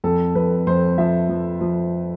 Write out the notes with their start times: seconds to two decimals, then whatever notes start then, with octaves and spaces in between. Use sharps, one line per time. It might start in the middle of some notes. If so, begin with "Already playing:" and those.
0.04 F2 A4
0.35 F2 B4
0.67 F2 C5
0.98 F3 E5
1.29 F3
1.61 F3